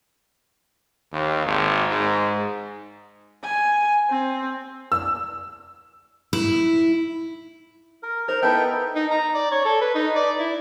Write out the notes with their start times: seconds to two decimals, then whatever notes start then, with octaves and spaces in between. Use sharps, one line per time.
1.13 D#2
1.46 G#1
1.90 G#2
3.43 G#5
4.10 C4
4.92 E6
6.33 E4
8.03 A#4
8.28 D#4 A#4 C5
8.42 B3 D#4 E4 A4 B4 E5 G5
8.95 D#4
9.11 A#5
9.34 D5
9.51 C#5
9.65 A4
9.81 B4
9.95 D#4
10.16 D5
10.39 E4